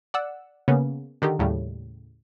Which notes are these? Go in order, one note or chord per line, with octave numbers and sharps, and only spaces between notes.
D5 F#5 E6
C#3 A#3 B3 C#4
D3 D#3 D#4 G4
D#2 A2 C#3 G3